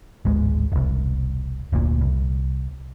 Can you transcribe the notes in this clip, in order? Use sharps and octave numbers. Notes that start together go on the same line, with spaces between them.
D1 G#1 G#3
E1 C2
F1 D2 A#2
C2